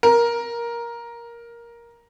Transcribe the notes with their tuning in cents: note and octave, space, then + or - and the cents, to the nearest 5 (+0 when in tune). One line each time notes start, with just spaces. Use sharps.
A#4 +10